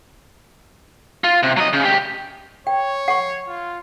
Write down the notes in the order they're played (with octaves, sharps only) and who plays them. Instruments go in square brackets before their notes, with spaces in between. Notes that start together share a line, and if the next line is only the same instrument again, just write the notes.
[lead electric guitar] F4
C3
F#3 D#5
C#3
D2 G4
[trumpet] C#5 [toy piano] G5
[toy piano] F#5 C#6
[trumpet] F4